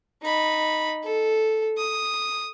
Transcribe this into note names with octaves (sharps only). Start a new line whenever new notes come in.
D#4 B5
A4
D#6